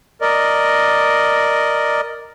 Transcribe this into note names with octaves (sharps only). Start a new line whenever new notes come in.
A#4 D5 D#5